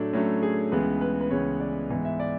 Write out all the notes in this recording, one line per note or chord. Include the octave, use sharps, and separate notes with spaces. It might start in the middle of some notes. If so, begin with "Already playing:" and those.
Already playing: A2 F#3 A3 D4
A2 F#3 A3 C#4
G#4
C#2 C#3 E3 G#3 B3 B4
B4
B4
C#2 C#3 E3 G#3 B3 C#5
D5
G#2 E3 B3
E5
D5